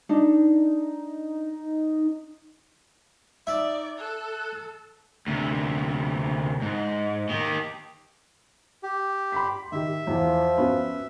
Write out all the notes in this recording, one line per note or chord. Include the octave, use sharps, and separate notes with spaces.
D4 D#4
D#4 D5 E5
A4 F#6
D2 C3
G#2
D#3 G4
G4
B5 C6 B6
D#3 G4 E5
E2 F3
B3 C#4 F#4